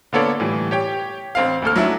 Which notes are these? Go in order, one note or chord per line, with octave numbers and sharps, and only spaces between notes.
D3 A#3 B3 A4 C#5 D5
A2 E3 G3
G4 C#5 G5
A1 C4 F5
D2 A#3 A4 F6
F#3 C#4 D4 E4